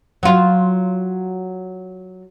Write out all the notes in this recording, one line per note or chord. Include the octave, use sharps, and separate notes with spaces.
F#3 F4